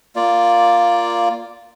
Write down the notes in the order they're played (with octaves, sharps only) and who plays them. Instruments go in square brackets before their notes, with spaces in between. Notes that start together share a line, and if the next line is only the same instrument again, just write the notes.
[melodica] A#3 F4 D5